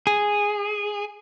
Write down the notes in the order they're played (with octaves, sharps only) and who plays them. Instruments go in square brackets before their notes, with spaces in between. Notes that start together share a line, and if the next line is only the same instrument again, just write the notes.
[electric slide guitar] G#4